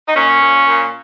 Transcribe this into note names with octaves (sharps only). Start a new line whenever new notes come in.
D#4
A#2 C#4
A#2
A#2